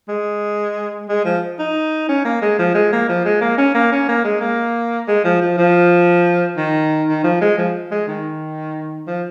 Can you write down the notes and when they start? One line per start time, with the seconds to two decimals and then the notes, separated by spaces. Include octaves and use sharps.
0.08 G#3
1.09 G#3
1.25 F3
1.59 D#4
2.09 C#4
2.25 A#3
2.42 G#3
2.59 F3
2.75 G#3
2.92 A#3
3.09 F3
3.25 G#3
3.41 A#3
3.58 C#4
3.75 A#3
3.92 C#4
4.09 A#3
4.24 G#3
4.41 A#3
5.08 G#3
5.24 F3
5.42 F3
5.58 F3
6.57 D#3
7.08 D#3
7.24 F3
7.42 G#3
7.58 F3
7.91 G#3
8.08 D#3
9.07 F3